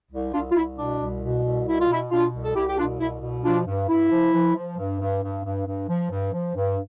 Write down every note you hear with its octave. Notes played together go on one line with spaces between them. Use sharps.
C2
C2 D4 F4
F4
C2 E4
B2 D4
C2
B2
C2
B2 E4
F4
B2 E4
B2 D4 F4
C2
A4
C2 E4 G4
G4
B2 D4 F4
C2 E4
B2
F3 D4 F4
G2
G2 E4
F3
F3
F3
G2
G2
G2
G2
G2
F3
G2
F3
G2